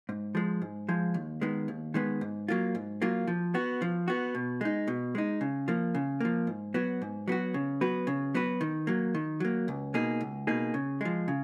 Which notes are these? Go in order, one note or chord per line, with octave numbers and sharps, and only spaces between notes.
G#2
F3 G#3
G#2
F3 G#3
D#2
D#3 G#3 B3
D#2
D#3 G#3 B3
G#2
F#3 A#3 F4
G#2
F#3 A#3 F4
F3
B3 F#4
F3
B3 F#4
B2
G#3 D#4
B2
G#3 D#4
C#3
F3 A#3
C#3
F3 A#3
G#2
F#3 B3 F#4
G#2
F#3 B3 F#4
C#3
F#3 B3 F#4 B4
C#3
F#3 B3 F#4 B4
D#3
F#3 A#3
D#3
F#3 A#3
C#2
B2 A#3 D#4 G#4
C#2
B2 A#3 D#4 G#4
C#3
F3 G#3
C#3